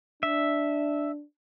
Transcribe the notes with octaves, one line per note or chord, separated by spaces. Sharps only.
D4 E5